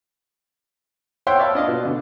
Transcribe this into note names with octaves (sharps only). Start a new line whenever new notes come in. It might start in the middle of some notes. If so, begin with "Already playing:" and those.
C5 C#5 E5 F#5 G5 C6
C#5 D5 E5 F5 A5 B5
D4 D#5 F5
B2
D3